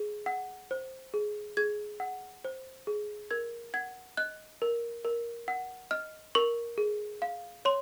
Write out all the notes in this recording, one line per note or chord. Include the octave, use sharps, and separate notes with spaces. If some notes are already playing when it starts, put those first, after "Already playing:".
Already playing: G#4
F#5
C5
G#4
G#4 G#6
F#5
C5
G#4
A#4 G#6
F#5 G#6
D#5 F#6
A#4
A#4
F#5
D#5 F6
A#4 C#6
G#4
F5
C#5 C6